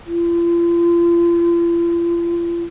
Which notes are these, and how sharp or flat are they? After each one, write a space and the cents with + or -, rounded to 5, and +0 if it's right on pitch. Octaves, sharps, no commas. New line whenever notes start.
F4 -40